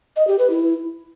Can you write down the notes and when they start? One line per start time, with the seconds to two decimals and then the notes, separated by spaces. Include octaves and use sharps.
0.16 D#5
0.27 G4
0.39 B4
0.50 E4